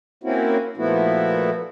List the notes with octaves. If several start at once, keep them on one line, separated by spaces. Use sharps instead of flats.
A#3 C4 C#4 E4 F#4
A#2 F3 A3 B3 E4 F#4